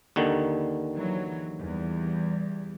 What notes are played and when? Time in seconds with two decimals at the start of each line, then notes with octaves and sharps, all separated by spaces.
0.16 D#2 D3 D#3
0.95 E3 F#3
1.60 E2 G3